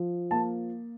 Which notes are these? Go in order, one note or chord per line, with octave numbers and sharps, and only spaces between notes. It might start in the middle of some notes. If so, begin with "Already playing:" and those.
Already playing: F3
A#3 A5